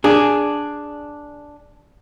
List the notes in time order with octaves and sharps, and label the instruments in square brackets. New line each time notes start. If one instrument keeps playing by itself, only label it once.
[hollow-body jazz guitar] D4 G#4